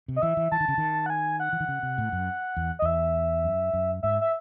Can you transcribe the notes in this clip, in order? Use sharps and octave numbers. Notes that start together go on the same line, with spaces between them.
C3
D#5
E3 E5
E3
E3 A5
D#3
C#3
D#3
F#5
G#5
F#5
E3
D#3
C#3
C3
A2
F#2
E2
D#5
E2 E5
F#2
F#2
G#2 E5
E5